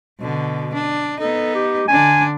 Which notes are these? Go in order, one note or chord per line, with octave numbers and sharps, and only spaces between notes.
B2 D3
D4
B3 D#4 A4
G4
D3 D4 G#5